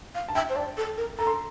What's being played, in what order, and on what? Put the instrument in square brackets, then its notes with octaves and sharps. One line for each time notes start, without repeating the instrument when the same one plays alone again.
[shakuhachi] F5
[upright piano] A5
[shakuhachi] E5 [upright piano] G5
[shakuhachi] C5
[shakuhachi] D5 [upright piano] A5
[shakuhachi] A4
A#4
[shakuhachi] A4 [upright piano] A#5
[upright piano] C6